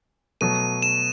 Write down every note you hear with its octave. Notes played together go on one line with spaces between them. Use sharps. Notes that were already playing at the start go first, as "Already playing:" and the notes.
B2 F#3 A3 D#7
E7